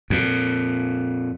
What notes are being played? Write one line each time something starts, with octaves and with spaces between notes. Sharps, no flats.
F2 A#2